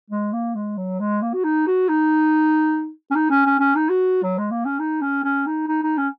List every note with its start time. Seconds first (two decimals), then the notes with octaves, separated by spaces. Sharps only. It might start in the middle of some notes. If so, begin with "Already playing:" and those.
0.10 G#3
0.33 A#3
0.55 G#3
0.78 F#3
1.00 G#3
1.22 A#3
1.34 F#4
1.45 D#4
1.67 F#4
1.89 D#4
3.11 C#4
3.15 D#4
3.30 C#4
3.46 C#4
3.60 C#4
3.75 D#4
3.89 F#4
4.23 F#3
4.38 G#3
4.51 A#3
4.65 C#4
4.79 D#4
5.01 C#4
5.24 C#4
5.47 D#4
5.68 D#4
5.83 D#4
5.98 C#4